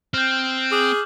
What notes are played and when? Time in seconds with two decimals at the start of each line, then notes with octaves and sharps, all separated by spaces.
0.14 C4 F6 G6
0.72 G#4 D6 F#6 F#7